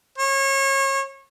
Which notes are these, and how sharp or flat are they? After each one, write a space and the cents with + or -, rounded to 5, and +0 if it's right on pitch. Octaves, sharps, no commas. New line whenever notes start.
C#5 -30